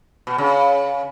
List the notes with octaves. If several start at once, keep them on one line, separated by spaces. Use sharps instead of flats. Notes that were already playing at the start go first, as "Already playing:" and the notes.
B2
C#3